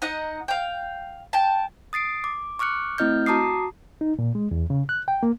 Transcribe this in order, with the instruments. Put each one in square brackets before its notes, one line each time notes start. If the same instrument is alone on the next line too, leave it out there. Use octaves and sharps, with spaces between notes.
[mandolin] D#4 D#5 F#5 A#5
F5 G5
G5 A5
[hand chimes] D#6 A6 C7 D7
D6
C#6 D6 F6 F#6 C#7
A3 C4 E4 D#5 F6 G6
F#4 A5 A#5 D6 D#6 C7
[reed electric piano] D#4
A#2
G#3
E2
C#3
F#6
G5
A#3